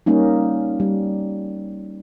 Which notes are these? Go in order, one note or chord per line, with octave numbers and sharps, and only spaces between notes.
G3 A#3 C#4 D#4
G3